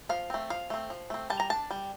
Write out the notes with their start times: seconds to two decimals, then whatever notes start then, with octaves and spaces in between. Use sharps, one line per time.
0.09 F3 F5
0.30 A3 C4
0.50 F3 F5
0.70 A3 C4
0.90 F3
1.10 A3 C4
1.30 G3 A5
1.40 A#5
1.50 D4 A5
1.70 G3